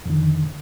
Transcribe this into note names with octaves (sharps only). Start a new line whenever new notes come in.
F2 D3 D#3